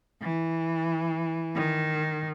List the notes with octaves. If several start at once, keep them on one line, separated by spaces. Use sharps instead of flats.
E3
D#3